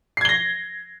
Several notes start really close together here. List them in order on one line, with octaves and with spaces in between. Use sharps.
C7 G#6 G7 A#6